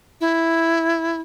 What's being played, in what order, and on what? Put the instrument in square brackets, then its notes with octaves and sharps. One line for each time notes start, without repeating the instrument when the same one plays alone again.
[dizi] E4